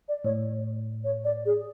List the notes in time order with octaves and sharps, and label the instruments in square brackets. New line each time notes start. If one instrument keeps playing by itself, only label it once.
[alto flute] D5
[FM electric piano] A2 [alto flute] C#5
[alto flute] C#5
D5
G#4